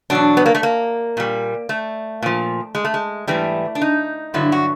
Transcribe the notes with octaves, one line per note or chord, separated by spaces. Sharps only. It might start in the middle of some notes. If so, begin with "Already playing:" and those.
E2 B2 F#3 D4
B3
A#3
A3
A#3
A#2 G3
A3
A#2 F3
G#3
A3
G#3
G#2 E3 G3 A3
D4
D#4
G2 D3 F#3 E4
F#4